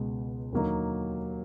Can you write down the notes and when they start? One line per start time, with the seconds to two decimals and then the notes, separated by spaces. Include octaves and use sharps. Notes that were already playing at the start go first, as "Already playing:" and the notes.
Already playing: C#2 B2 G#3 B3
0.52 D#2 D3 F#3 A#3 D#4